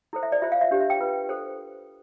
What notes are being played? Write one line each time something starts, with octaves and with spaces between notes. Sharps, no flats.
E4 A4 C5
E5
D5
F4 C5 E5
F5
E5
D4 G4 C5
E5
G5
F4 B4
A4 C5